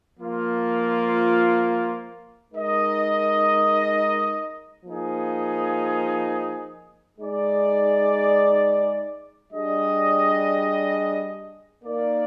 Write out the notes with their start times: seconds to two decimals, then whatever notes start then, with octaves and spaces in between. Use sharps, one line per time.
0.20 F3 A#3 F4
2.53 G#3 D#4 A#4 D#5
4.86 F3 A#3 D#4 G#4
7.19 G#3 D#4 G#4 D5
9.51 G3 D4 G#4 D#5
11.84 A#3 D#4 A#4 D5